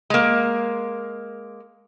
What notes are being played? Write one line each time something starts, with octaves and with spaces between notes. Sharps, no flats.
G#3 A#3